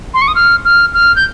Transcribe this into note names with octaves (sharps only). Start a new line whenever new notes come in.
C6
C#6
D#6
F6
F6
F6
G6